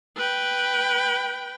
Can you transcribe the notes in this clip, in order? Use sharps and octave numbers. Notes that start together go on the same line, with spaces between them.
B4 G5